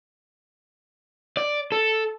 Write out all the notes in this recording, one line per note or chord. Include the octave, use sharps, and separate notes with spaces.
D5
A4